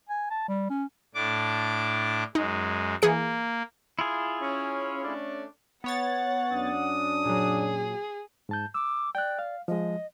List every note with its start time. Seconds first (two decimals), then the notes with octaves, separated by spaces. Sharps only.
0.10 G#5
0.31 A5
0.48 G3
0.70 C#4
1.15 A2 D4 D6
2.35 F#2 G#3 D#4
3.02 E3 A#3 G#4 C#7
3.99 E4 F4 G#4
4.41 C#4
5.04 A3 C#4 D4
5.84 B3 C#5 F#5 A6
6.52 F#2 C#4 D4 D#6
7.26 A#2 F#3 G#4
8.49 G#2 A5 G6
8.74 D6 E6
9.15 D5 G5 F#6
9.39 F5
9.68 F3 G#3 D#5